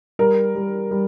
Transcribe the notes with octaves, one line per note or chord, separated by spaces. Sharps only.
G3 A#4
G3
G3